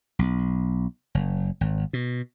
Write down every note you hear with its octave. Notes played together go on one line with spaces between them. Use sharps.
B1
F#1
G#1
B2